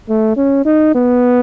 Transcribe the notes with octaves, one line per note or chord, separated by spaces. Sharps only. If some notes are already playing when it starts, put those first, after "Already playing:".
A3
C#4
D#4
B3